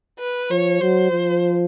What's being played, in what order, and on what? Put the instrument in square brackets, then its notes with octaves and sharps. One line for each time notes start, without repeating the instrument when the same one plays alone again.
[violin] B4
[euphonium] F3 [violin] C#5
[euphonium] F#3 [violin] C5
[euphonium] F3